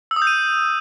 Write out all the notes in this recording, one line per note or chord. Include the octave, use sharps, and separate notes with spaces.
E6
D#6
G6
D#7